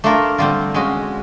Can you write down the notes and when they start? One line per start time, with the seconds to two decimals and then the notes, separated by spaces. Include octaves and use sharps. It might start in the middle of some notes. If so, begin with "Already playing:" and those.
0.04 A3 D4 F4 A#4
0.38 D3 G3 C4 F4
0.74 G#3 C#4 F#4